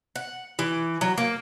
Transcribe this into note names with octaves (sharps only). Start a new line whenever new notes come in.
F#5
E3
F#3
A#3